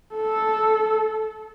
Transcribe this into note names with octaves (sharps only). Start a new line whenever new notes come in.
A4